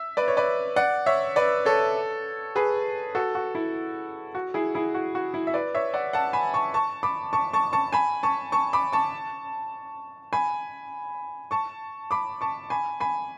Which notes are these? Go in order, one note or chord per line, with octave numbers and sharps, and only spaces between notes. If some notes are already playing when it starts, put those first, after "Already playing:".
Already playing: E5
B4 D5
C#5
B4 D5
D5 F#5
C#5 E5
B4 D5
A4 C#5
G#4 B4
F#4 A4
F#4
E4
F#4
E4 G#4
E4 G#4
F#4
F#4
E4
E5
B4 D5
C#5 E5
D5 F#5
F#5 A5
G#5 B5
A5 C#6
A5 C#6
B5 D6
A5 C#6
A5 C#6
A5 C#6
G#5 B5
A5 C#6
A5 C#6
B5 D6
A5 C#6
G#5 B5
A5 C#6
B5 D6
A5 C#6
G#5 B5
G#5 B5